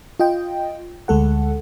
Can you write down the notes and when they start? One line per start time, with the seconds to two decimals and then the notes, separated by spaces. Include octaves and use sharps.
0.20 F4 D#5 G5
1.08 D2 G#3 A4 F#5